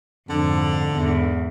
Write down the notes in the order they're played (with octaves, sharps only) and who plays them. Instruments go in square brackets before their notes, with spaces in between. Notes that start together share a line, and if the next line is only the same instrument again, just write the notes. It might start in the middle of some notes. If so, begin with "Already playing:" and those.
[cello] F2 G#2 [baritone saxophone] D3
[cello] E2 G#2